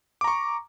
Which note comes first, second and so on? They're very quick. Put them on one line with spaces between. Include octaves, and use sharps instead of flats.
D6 A#5 C#6